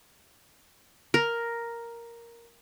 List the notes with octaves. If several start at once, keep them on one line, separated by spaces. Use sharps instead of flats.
A#4